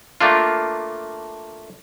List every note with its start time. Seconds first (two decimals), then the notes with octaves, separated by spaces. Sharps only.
0.21 A3 A#3 D4 F4